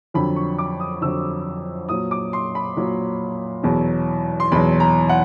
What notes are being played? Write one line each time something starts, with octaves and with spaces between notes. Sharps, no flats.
F2 D3 F#3 B5
C#6
D6
D#6
F2 D3 F#3 E6
A#2 F#3 D#6
D6
C6
B5
A#2 F#3
E2 B2 F#3
C6
E2 B2 F#3 B5
A#5
F#5